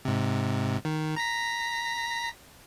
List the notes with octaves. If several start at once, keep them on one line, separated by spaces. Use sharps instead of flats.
G#2 C3
D#3
A#5 A#6 B6